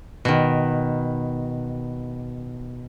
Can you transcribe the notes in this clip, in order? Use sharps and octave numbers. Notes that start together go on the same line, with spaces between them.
B2 D#3